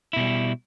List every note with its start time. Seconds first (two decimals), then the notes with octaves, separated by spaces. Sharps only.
0.13 E4
0.16 B2
0.20 G3